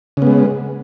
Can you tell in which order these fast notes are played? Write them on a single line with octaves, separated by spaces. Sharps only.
C#3 B3 G#3